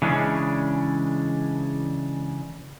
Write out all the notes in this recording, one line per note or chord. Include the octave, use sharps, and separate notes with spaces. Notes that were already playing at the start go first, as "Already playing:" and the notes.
C#3 E3 G#3 C#4 D4